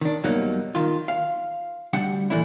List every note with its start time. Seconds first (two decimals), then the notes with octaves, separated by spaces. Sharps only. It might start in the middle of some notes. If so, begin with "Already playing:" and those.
0.01 D#3 D4
0.23 F#2 B2 F#3 G3 A#3 D#4
0.75 D#3 F4
1.08 F5
1.93 D2 G3 D4 F#5
2.30 A#2 C#3 E3 A3 D4 E4